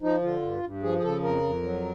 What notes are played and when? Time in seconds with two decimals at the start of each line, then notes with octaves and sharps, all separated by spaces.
0.02 F3 D#4
0.22 D3 F4
0.42 G2
0.63 G2
0.83 F3 G#4
0.98 G#4
1.03 C#3 A4
1.23 F2 A#4
1.43 F2
1.63 F#3